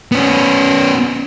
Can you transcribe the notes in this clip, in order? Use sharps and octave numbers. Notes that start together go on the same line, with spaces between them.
B3 C#4